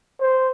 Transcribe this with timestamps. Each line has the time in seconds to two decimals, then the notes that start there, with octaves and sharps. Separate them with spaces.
0.21 C5